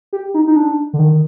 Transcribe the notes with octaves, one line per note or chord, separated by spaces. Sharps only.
G4
D#4
D#4
D4
D3
D#3